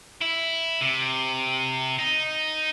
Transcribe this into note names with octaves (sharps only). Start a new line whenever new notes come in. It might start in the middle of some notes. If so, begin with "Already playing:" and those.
E4
C3
D#4